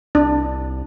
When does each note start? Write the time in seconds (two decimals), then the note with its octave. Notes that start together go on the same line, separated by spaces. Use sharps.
0.15 C2 D4